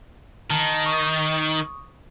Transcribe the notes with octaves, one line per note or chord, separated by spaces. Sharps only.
D#3 A5 A#5
C#6 D#6